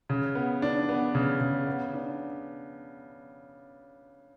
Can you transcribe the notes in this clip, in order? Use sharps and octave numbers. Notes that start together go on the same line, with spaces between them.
C#3
B3
D4
B3
C#3
C#3
B3
D4